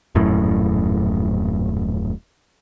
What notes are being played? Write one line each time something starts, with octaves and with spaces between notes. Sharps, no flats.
D#1 F#2 A2